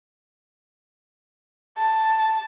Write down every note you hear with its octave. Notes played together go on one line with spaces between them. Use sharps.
A5